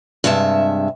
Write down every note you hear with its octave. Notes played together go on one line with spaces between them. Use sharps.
G2 C3 G#3 E5 A5